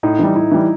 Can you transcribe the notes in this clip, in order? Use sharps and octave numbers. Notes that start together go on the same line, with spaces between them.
A2 D#4
E3 G3
A2 E4
E3 G3